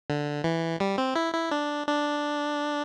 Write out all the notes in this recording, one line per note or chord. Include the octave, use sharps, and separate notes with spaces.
D3
E3
G3
C4
E4
E4
D4
D4